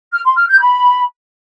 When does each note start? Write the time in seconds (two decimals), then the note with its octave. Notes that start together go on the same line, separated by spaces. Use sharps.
0.12 F6
0.24 C6
0.36 F6
0.48 G6
0.60 B5